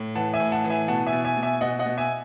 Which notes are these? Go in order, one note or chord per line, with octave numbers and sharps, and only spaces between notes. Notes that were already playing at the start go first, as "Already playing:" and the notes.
Already playing: A2
E3 F#5 A5
E5 G#5
A2
F#5 A5
E3
E5 G#5
B2 F#5 A5
E5 G#5
B2
E5 G#5
B2
E5 G#5
B2 D#5 F#5
D#5 F#5
B2
E5 G#5